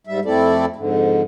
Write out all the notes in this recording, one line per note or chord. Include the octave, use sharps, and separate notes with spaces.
G#2 G3 E5
F2 A3 C4 E4 A4 D5
F2 G#2 D3